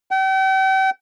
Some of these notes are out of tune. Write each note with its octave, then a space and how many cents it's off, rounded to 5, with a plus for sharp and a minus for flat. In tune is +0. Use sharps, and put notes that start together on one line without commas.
G5 -40